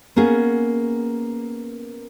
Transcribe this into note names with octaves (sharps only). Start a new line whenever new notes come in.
A#3 B3 C#4 G#4